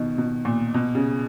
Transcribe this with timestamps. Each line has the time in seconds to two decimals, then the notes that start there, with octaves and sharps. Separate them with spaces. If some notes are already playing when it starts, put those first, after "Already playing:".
Already playing: B2 D#3
0.18 B2
0.45 A#2
0.74 B2
0.95 C#3